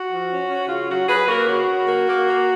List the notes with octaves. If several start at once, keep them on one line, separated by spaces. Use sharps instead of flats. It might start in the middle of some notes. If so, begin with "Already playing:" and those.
Already playing: F#4
F3
C#4
C#4
C#3 F4
F#3 F#4
F#3 G#4 B4
A#3 F#4 A#4
C#3 F#4
C#3
A#3
A#3
A#3